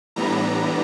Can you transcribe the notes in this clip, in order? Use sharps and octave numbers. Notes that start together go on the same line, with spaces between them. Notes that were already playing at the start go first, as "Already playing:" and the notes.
A2 E3 G3 B3 D4 A#5